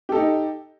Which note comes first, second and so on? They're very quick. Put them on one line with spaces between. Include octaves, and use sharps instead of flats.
G4 A4 D#4